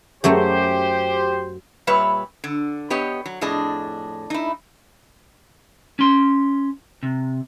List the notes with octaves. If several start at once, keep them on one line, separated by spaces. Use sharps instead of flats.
F#2 F#3 A3 G4 C5
A#2 G3 B4 C#5 E5
D3
B3 G4 C#5 D#5
F#3
F2 A2 D4 G#4 D#5
D#4 E4
C#4 C6
C3